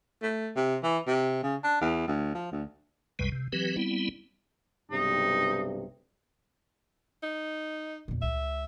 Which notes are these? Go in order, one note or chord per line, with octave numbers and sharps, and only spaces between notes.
A3
C3
E3
C3
C#3
D4
E2
D2
F3
D2
C2 F#2 C3 G3 G#3 B4
C3
E3 F#3 C4 G4 B4
G3 B3 C4 E4
B1 G2 C3 D#4
D#4
E2 A#2
C#2 E5